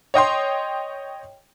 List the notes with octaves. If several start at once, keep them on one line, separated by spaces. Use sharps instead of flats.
C#5 D#5 G5 C6